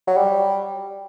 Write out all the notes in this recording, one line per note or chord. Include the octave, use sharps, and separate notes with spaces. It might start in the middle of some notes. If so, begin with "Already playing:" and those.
F#3
G3